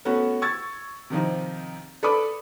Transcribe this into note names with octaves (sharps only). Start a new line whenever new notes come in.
A3 B3 C#4 F#4
C#6 E6 G#6 A6
C3 D#3 F3 D#4
A4 B4 D5 B5 D6 D#6